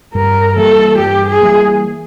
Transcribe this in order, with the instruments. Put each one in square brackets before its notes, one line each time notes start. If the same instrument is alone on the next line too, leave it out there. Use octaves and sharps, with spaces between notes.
[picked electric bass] G2 [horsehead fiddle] A#4
[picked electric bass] E3 G3 A#3 [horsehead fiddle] A4
[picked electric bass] G2 [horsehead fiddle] G4
[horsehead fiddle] G#4
[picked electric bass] E3 G3 A#3